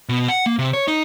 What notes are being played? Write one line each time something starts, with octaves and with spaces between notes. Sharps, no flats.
B2
F#5
A#3
C3
C#5
D#4